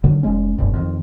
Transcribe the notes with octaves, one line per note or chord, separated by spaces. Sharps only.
D3 D#3 F#3
F1 E2 G#3 C#4
F1 B1 G2
F2 D3 D#3